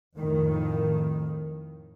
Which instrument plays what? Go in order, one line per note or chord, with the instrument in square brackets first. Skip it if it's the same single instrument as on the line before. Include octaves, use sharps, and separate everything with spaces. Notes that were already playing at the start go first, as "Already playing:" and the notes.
[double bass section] F2 A2 D#3